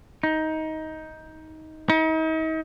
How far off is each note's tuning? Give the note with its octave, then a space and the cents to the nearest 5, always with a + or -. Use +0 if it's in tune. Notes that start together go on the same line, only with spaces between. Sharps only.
D#4 +15
D#4 +40